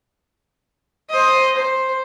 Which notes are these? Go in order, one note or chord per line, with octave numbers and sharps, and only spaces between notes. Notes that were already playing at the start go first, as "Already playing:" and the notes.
C5 D#5
C5